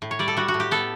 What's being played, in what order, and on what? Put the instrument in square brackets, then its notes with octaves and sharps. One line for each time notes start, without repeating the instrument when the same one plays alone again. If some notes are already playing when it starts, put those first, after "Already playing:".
[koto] A2
C#5
G3 D5
A4
G3 F#4
F#4
A2
G4
B3 A4